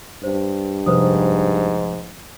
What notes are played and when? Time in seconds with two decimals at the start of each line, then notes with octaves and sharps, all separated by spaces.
0.24 G2 C5
0.86 F1 G#2 B4 C5 D#6